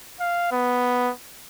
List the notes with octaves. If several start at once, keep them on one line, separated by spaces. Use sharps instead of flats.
F5
B3